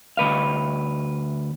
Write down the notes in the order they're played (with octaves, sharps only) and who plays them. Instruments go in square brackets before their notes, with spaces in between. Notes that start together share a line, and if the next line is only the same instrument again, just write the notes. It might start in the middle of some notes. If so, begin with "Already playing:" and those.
[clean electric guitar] D2 B4 F5